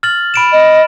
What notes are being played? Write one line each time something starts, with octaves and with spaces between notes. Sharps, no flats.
F6 A6 F#7
B5 D7 E7
D#5